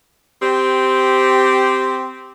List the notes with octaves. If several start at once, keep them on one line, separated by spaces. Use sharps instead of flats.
C4 G4